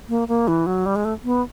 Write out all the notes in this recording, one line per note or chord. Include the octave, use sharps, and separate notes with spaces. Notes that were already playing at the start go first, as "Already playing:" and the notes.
A#3
A#3
E3
F#3
G3
G#3
A3
B3